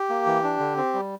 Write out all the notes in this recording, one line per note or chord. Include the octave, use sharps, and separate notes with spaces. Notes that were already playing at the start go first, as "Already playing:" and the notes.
Already playing: G4
A#3
E3
D4
D3
C4
G3